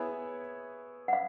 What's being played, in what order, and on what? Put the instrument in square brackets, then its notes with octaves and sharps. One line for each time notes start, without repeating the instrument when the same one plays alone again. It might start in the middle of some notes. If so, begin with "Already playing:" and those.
Already playing: [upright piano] B3 E4 G#4 C#5 E5
[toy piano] F#5
F5